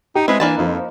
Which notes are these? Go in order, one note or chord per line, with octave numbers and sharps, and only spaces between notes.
D#4 G4
G#3 C4 E4 B4
E3 A#3 D4 E4 B4 A5
F2 F3 D#4